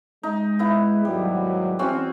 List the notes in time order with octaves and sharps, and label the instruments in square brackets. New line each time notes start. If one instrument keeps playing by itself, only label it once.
[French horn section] G#3 [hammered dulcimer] D#4
[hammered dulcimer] B3 E4
[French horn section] D#2 G#2 F#3 [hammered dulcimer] G3
[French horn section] E2 [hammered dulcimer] C4 C#4 F#4